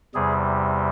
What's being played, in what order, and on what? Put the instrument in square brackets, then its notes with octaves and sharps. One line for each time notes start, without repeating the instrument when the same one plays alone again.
[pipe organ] E2 C3 G3 G#4